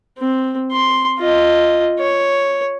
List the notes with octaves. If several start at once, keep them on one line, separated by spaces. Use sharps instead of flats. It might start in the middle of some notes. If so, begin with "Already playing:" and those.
C4
C6
F4 D#5
C#5